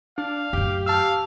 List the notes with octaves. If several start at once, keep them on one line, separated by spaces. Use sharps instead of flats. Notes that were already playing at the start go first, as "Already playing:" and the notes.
D4 F5
F#2 A2 G4
F5 A5 E6